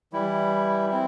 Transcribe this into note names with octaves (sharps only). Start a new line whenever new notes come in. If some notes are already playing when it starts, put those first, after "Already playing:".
E3 G3 E4
C4 E4